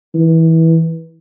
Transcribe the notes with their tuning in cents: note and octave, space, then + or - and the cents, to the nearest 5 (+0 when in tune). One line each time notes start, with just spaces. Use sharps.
E3 -20